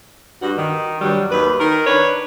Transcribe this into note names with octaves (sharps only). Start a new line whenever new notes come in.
G2 F#4
D#3
G2 F#3 G3
D#2 B4
D#3 A#4
D4 B4 C#5